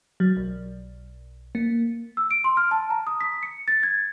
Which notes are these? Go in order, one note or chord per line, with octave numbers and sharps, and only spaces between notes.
F#3
B1
A#3
E6
D7
C6
F6
A5
A#5
D#6
B6
C#7
A6
G#6